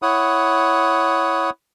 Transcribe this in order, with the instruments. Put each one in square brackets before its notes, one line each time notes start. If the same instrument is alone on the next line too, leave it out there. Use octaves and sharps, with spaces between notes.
[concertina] E4 C#5 F#5 D#6